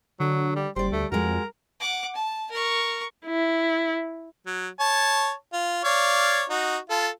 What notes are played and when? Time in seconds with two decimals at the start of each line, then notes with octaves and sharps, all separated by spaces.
0.20 D3 F#3
0.56 G3
0.76 F#1 G3 C5 D5
0.92 D2 A3
1.12 F2 G#3 F#4 A#4
1.80 F#5 D6
2.16 A5
2.51 A#4 C#6
3.26 E4
4.46 F#3
4.80 C#5 A5
5.53 F4
5.84 C#5 D5 F5
6.50 D#4 F#4
6.90 F4 A4